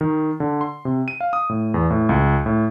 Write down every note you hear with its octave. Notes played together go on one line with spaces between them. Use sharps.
D#3
D3
C6
C3
D#7
F5
D#6
A2
E2
A2
C#2
A2